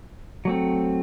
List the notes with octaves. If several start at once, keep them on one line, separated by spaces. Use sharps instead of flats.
F#3 A3 C4